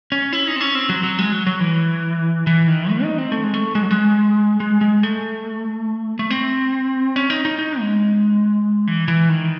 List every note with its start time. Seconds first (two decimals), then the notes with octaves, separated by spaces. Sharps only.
0.12 C#4
0.33 E4
0.48 D#4
0.56 C4
0.61 C#4
0.75 C4
0.89 F#3
1.03 F#3
1.19 G#3
1.32 F#3
1.47 F#3
1.60 E3
2.47 E3
2.68 D#3
2.90 A3
3.03 D#4
3.18 C4
3.32 A3
3.44 G#3
3.54 A3
3.75 G#3
3.83 F#3
3.91 G#3
4.60 G#3
4.81 G#3
5.03 A3
6.19 A3
6.30 C4
7.16 C#4
7.30 D#4
7.45 D#4
7.59 D#4
7.80 G#3
8.87 E3
9.08 E3
9.29 D#3